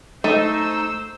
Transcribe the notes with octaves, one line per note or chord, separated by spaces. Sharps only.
A3 D#4 C5 E6